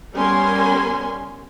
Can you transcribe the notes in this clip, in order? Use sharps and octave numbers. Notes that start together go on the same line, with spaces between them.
G3 B3 C#4 A#4 G#5 C6